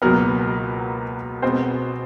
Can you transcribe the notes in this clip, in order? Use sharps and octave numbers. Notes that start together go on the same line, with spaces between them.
C#2 B2 F#3 A#3 B3 A#4
B2 G#3 B3 C4 C5